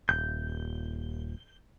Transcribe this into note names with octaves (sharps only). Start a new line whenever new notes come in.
D#1 G6